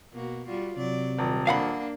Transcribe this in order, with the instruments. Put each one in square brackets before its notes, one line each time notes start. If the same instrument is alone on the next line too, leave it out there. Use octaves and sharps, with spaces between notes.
[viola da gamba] B2 A#3 F#4
G3 F4 F#4
[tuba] C3 [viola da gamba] F#3 D5
[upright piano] D#1
[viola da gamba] A#3 D4 [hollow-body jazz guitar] F5 F#5 B5